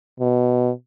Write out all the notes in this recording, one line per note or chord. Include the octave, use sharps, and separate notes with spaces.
B2